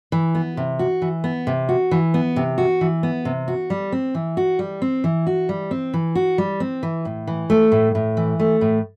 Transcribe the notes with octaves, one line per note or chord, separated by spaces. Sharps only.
E3
B3
C3
F#4
E3
B3
C3
F#4
E3
B3
C3
F#4
E3
B3
C3
F#4
G3
C4
E3
F#4
G3
C4
E3
F#4
G3
C4
E3
F#4
G3
C4
E3
A2
E3
A3
A2
A2
E3
A3
A2